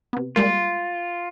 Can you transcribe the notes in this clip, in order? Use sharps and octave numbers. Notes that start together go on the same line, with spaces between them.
C3 B3
G3 G#3 A#3 F4